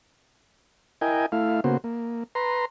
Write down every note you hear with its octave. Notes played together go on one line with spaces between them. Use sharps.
E4 A#4 D#5 G5 G#5
A3 E4 F5
C#3 A#3 B3 F#4 C5
A#3
B4 A#5 C6